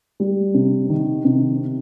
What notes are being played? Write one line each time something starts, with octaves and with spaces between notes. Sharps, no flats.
G3
C3
D#3
C3